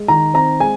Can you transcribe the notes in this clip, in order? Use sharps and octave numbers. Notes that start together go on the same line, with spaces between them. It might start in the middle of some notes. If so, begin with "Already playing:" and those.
Already playing: G#3
D#3 A#5
C4 A#5
G#3 G#5